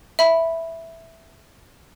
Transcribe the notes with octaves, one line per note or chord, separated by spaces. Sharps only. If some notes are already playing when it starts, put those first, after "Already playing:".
E5 B5